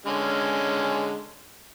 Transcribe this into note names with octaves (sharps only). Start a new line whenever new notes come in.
D3 G#3 C#4